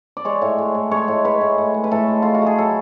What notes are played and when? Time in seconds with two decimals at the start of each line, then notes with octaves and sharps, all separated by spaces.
0.17 D5
0.25 G#3 C#5
0.42 A2
0.58 G#3
0.75 A2
0.91 G#3 C#5
1.08 A2
1.24 G#3 B4
1.41 A2
1.58 A2
1.74 G#3
1.84 B4
1.91 A2 A4
2.08 G#3
2.22 A3 F4
2.35 F#4
2.42 A3 G#4
2.58 F#3 A4